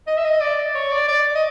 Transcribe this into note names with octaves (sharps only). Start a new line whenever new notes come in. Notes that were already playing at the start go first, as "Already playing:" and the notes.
D#5
E5
D#5
D5
C#5
D5
D5
D#5